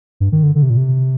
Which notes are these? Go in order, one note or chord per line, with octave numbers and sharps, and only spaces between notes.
G2
D#3
D3
D3
C3
A#2
C3